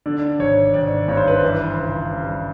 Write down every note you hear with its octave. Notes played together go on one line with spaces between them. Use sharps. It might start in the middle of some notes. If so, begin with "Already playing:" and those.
D3 D5
G#1 C#5
G#1 D5
G2 C#5
C5
B4
C5
E3
C#2
G3